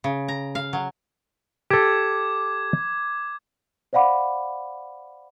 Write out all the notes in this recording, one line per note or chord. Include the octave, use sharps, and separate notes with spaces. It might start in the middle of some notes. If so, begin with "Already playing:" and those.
C#3
A#5
F5
F#3
G4 A4 D6 G#6
C5 D5 F5 F#5 B5 D6